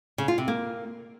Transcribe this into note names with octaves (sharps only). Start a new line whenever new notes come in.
C#3
F4
C3
A#3